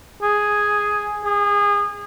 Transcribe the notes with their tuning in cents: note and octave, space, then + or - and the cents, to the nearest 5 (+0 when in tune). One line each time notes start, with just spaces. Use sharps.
G#4 +0
G#4 -30